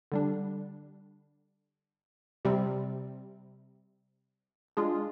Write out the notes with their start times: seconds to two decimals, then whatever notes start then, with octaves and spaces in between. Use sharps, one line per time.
0.12 D3 G3 D4
2.45 C3 G3 C4
4.77 G#3 D4 F4 G#4